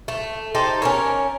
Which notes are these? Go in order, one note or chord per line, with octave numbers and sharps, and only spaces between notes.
A3
D#4 G4 A4 C5
C#4 A#4 C#5